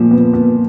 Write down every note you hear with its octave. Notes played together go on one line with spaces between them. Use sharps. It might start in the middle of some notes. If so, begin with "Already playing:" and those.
Already playing: A#2 F3
B3
B3